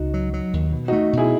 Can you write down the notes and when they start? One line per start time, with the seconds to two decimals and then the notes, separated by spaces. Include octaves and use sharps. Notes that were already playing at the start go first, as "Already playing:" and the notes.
Already playing: C#2 D#4 F#4
0.14 F#3
0.34 F#3
0.53 D#2
0.72 B2
0.88 A3 D#4 F#4
1.13 B2 E4 G#4